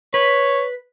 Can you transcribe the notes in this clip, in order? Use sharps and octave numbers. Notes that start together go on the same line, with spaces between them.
B4 C#5